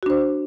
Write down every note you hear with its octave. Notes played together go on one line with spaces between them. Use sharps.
D4 F#4 C5